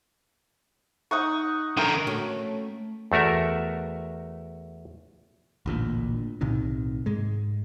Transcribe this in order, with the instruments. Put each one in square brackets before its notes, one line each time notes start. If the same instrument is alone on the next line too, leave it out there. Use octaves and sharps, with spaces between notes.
[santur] D#4 F#5 C#6
[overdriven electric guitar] D3 A#4 [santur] G5
[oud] A3 C#4 F#4
[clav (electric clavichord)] E2 A3 F#4 A#4 E5
[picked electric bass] A1 D2 A#2
B1 A2 C3 D#3
G#2 G#3